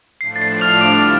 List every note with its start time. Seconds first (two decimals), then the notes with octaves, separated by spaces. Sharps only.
0.21 A2 F3 A3 D4 C7
0.36 A6
0.42 C7
0.61 F6 F7
0.72 F7
0.81 D3 G3 F4 D6 D7